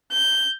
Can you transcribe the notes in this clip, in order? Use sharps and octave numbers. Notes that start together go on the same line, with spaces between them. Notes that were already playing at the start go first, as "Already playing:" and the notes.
G6